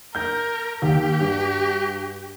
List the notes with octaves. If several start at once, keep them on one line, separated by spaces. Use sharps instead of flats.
A#4 G6
D#2 G4
G2